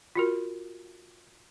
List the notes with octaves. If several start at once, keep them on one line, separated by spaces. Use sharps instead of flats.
F4 F#4 A#4